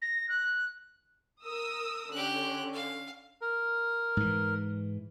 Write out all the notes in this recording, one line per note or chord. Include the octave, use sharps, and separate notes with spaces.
A#6
F#6
A#4 D#6 E6
D3 C#4 G4 F#6
F5
A#4
G#2 E3